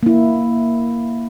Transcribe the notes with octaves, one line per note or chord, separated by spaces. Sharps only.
A#3 E4